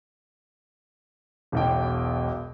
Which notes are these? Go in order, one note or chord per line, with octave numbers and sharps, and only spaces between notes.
E1 B1 G5